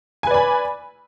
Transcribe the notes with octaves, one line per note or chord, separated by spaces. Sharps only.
B4 D5 G#5 B5